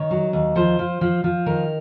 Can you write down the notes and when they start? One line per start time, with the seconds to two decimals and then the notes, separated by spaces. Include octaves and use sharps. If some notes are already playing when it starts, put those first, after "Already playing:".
Already playing: D#3 C#5
0.11 F#3
0.33 D#2
0.56 F3 C5
0.79 F3
1.01 F3
1.24 F3
1.46 D#3 A#4